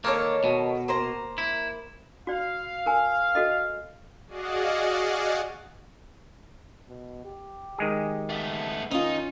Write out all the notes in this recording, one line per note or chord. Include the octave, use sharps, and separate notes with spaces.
D#3 A#3 A4 C#5
B2
A#3 C5 A#5
E4
F#4 D5 F5
A#4 G#5
F#4 A4 D#5
F#4 G#4 D5 D#5 F5 F#5
B2
G4
D#3 G#3 G#4
A3 B3
D#3 C#4 D#4 F4